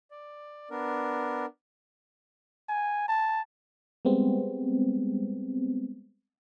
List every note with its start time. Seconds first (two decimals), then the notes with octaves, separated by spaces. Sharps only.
0.11 D5
0.70 B3 D4 A#4
2.69 G#5
3.08 A5
4.05 G3 G#3 B3 C4